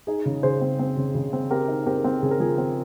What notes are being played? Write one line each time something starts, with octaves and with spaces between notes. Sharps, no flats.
D#4 G#4
C#3
C#3 G#4 C5
C4
C4
C#3
C#3
C4
C4 G4 A#4
D#4
C4 G4 A#4
C4
C#3 G#4
A#4
F3 G#4
C4